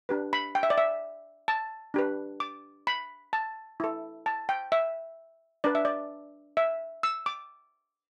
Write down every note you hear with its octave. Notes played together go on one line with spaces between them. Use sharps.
D4 G4 B4
B5
G5
E5
D5
E5
A5
D4 G4 B4
D6
B5
A5
E4 A4
A5
G5
E5
D4 B4 D5
E5
D5
E5
E6
D6